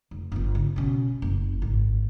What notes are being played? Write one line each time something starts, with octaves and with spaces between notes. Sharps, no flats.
F1
G1 B3
C#3
B2 C#4
F#1
G#1